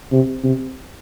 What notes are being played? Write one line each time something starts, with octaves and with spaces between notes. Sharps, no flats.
C3
C3